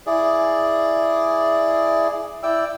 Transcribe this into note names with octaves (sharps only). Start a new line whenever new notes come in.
E4 G#4 D5
E4 D5 G5 E6